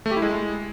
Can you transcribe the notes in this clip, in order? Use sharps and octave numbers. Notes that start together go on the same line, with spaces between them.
A3
G4
E4
G#3